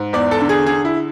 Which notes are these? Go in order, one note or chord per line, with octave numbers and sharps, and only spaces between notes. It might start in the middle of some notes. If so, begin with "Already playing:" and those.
Already playing: G#2
E2 D5
A4
D3
G#4
D3 G#4
E4